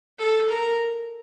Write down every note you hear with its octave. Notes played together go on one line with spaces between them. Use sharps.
A4
A#4